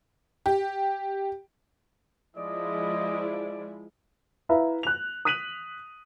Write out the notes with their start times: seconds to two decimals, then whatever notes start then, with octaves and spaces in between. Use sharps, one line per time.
0.46 G4
2.37 F3 G#3 E4 D5 D#5
4.49 E4 B4 E5 F5 A#5
4.83 F#6 F7
5.25 D#6 F#6 B6 D#7 F7 F#7